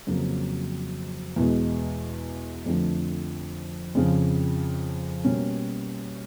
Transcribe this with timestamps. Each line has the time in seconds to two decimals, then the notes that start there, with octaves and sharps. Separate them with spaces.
0.07 F2 C#3 F#3 A#3
1.36 E2 B2 G#3
2.66 F2 D3 F3 A3
3.95 F2 C#3 F3
5.24 B2 G3 A#3 C#4